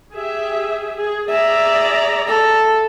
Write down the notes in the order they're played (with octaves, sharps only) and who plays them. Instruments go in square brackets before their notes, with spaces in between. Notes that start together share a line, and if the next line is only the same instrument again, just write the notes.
[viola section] G4 G#4 E5
G#4
[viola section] G#4 D5 A#5 [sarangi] E5
[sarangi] A4